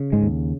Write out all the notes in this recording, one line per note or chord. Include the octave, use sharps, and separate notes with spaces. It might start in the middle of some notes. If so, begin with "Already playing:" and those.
Already playing: C#3
G#2 G#3
D#2